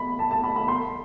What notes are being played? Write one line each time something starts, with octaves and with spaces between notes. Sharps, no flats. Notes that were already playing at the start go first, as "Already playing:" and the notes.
Already playing: B5
A5
A5
B5
B5
C6